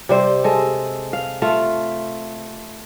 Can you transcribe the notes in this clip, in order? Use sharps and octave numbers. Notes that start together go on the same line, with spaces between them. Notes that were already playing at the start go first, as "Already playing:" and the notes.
C3 G3 C5
G#3 A4
F5
A3 F4 F5